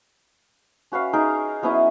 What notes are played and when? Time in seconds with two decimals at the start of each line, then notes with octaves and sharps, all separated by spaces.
0.92 C#4 F#4 B4 F5
1.13 D#4 G#4 A#4
1.62 F#3 B3 C#4 E4